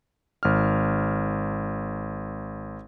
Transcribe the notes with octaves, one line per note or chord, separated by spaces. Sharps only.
G#1 F6